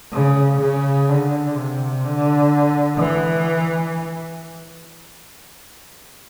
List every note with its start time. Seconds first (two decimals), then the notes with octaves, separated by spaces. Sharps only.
0.13 C#3
0.60 C#3
1.09 D3
1.56 C3
2.04 D3
2.98 E3